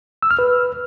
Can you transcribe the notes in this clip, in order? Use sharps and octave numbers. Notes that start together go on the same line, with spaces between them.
E6
F6
B4